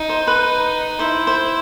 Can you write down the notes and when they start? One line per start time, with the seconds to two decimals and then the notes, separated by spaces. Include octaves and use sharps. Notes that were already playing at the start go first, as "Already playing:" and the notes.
Already playing: D#4
0.09 C5
0.27 B4
0.99 E4 C5
1.27 C5